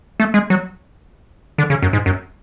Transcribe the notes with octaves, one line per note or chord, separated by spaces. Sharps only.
A3
G#3
F#3
D3
C#3
F#2
G#2
F#2